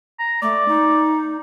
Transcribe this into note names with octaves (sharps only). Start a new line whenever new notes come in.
A#5
A3 D5
D#4